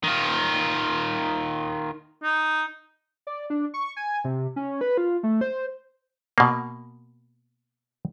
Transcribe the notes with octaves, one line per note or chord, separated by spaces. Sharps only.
D#3 F4
D#4
D5
D4
C#6
G#5
C3
C#4
B4
F4
A3
C5
B2 A#3